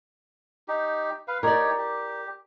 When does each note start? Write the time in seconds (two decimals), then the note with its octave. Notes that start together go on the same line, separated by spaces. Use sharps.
0.68 D#4 G4
1.28 B4 F5
1.43 D#4 G4 A#4 C#5 D5
1.78 G4